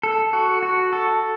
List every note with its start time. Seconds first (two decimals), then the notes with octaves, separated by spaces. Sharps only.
0.03 A4
0.33 F#4
0.63 F#4
0.93 A4